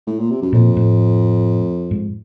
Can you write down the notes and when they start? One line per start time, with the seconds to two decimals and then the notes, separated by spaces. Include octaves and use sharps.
0.07 A2
0.19 A#2
0.30 C3
0.42 F#2
0.53 F2 A#2
0.77 A2
1.91 G#2